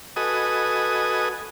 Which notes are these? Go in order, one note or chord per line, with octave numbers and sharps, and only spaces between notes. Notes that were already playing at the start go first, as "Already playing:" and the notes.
F#4 A4 B4 D#5 G#5 D#6